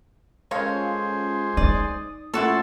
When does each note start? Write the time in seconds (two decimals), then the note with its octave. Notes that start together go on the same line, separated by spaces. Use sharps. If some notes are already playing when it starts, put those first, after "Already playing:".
0.51 G#3 A#3 C#4 F4 A4 C5 C#5
1.57 D#4 D5 D#6
2.34 A#2 A3 C#4 E4 F#4 A4 C6